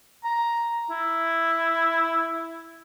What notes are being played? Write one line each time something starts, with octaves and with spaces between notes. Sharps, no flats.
A#5
E4